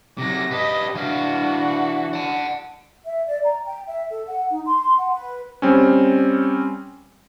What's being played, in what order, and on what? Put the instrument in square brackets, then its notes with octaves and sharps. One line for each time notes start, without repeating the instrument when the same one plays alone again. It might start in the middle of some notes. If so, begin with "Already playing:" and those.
[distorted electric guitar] C3 F#3 [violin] D6 A#6
[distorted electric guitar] G4 B4 [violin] D#5
[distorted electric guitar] E3 F5 [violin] D4 F#4
[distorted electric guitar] F#5 A5
[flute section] E5
D5
A#5
G5
E5
A4
F#5
D#4
C6
F#5
B4
[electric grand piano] G3 C4 C#4